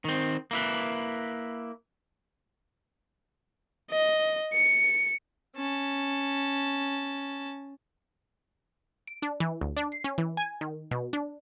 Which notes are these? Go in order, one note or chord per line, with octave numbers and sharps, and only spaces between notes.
D#3 C4
A#3 E4 B4
D#5
C#7
C#4 A5
D7
D4
E3
D2
D4
C7
C#4
E3
G#5
D#3
B2
D4